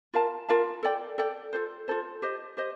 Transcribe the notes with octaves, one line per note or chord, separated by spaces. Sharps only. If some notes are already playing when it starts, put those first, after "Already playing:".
F4 A#4 F5 A5
F4 A#4 F5 A5
A4 D5 G5
A4 D5 G5
F4 A4 C5
F4 A4 C5
G4 C5 D#5
G4 C5 D#5